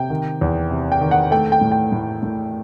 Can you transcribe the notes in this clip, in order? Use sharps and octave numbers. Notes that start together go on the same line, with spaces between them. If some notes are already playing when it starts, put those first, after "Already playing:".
Already playing: C3 G5
D#3
E2
C3
G5
D#3
F#5
A3 G5
G5
A2
G5
A2
A2